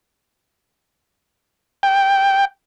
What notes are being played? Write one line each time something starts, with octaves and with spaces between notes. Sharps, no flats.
G5